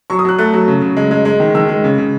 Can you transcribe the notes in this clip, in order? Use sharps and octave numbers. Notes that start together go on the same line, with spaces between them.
F#3 C#6
D#6
F#3 F#6
A3 F#6
F#3
C#3
C#3
G#3
G#3
G#3
D#3
D#3 E6
G#3
C#3
C#3